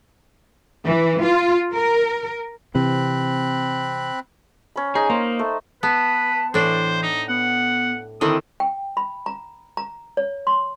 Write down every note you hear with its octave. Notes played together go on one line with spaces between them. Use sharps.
E3
F4
A#4
C3 E3 C4 B5 F#6
C#4 B5
D#4 G#4 C#5 D#5
A#3 C5
A3
B3 B4 A5
A2 E3 D4 C5
D#4
B3 F#5
D3 D#3 C4 E4 D#6
G5
B5
A#5
A#5
C#5
C6